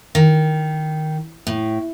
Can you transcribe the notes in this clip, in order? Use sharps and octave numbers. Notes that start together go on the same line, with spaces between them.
D#3
A2